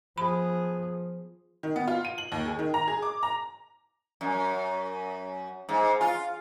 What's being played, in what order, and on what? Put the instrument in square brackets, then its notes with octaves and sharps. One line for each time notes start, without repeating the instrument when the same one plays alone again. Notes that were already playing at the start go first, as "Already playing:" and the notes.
[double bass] F3 [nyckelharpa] B3 G#4 [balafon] B5
[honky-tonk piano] D#3
B3
F4
D#7
F#7
D#2
G#4
D#3
A#5
G#4
D6
A#5
[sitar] F#2
G#2
F4